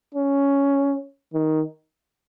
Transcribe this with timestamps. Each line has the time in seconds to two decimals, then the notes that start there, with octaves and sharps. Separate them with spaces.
0.14 C#4
1.34 D#3